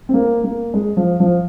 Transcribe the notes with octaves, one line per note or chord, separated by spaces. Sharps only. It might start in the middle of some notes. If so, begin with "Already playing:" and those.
C4
A#3
A#3
G#3
F3
F3